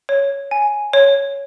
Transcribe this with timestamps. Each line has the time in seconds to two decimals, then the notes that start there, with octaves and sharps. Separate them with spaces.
0.09 C#5
0.51 G#5
0.93 C#5